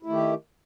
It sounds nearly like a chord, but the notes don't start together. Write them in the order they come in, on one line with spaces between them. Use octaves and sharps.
E4 A3 D#3 G4